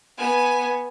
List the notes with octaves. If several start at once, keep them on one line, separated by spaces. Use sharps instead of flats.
B3 G#5